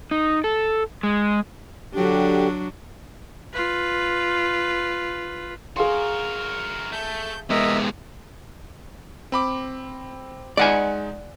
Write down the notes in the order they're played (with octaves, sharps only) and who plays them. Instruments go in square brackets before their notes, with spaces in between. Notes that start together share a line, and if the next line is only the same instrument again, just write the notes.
[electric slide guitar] D#4
A4
G#3
[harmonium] D3 G4 [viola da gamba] F#3 D4
[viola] F4 B4
[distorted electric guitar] F#4 A#4 [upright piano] G#4 F5 C6
[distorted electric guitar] A3 [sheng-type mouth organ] G6
[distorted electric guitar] C#2 C3 [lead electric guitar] G#3 B3 [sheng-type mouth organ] A#4 D#5 E5
[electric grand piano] C4 B5 D6
[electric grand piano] G#3 D#4 [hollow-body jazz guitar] D5 F#5 G#5